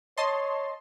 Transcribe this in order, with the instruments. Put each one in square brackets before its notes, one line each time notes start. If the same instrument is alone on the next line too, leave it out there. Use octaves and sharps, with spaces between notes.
[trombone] C#5 [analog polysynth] D#5 A5 C6